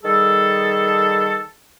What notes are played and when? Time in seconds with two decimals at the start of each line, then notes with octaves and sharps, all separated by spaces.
0.03 D#3 G3 G#4 A4